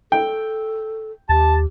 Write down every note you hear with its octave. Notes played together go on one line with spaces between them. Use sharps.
A4 G5
D#2 G4 A5